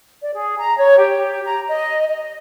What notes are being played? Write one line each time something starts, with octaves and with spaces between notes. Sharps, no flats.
D5
G#4
A#5
C#5
G4
A#5
D#5
D#5